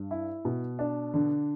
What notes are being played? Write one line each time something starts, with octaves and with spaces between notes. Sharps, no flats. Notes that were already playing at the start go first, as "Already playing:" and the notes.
Already playing: G2
E4
B2
D4
D3